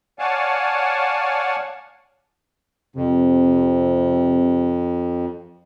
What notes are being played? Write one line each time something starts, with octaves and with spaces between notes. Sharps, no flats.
C#5 D5 F5 F#5 G#5 A5
F2 C3